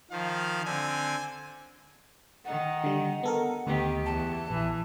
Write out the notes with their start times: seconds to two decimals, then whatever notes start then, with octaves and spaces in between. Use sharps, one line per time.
0.11 D#3 F3 F5
0.66 D3 C4 G#5
2.45 D#3 D#4 F#5
2.84 D3 G3
3.23 B3 A4 A#4
3.67 D2 D#3 B3 G4
4.06 E2 A5
4.50 A#1 E3